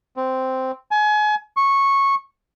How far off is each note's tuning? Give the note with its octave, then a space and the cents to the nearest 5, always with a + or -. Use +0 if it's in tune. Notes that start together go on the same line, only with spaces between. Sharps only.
C4 -5
G#5 +30
C#6 -10